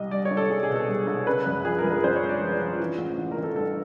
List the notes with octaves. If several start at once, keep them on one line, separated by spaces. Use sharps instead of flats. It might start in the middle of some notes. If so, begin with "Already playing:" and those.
Already playing: C2 G3 D#5
G3 D5
C#5
C2
A4
C2 G#4
G#4
B2
A4
G3
C2
C#3 B4
F#2
F3 G#4
A#4
F#2
B4
F#2 C5
C#5
G#3
D5
F3
F3
E3
A1
A1
A#4
A1
A4
G2 A4